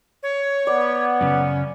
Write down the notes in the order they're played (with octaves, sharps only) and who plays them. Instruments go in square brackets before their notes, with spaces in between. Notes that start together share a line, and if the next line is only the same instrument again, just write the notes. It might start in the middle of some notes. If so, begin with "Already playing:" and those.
[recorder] C#5
[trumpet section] B3 [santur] D5
[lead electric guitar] F#2 C#3 [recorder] C#4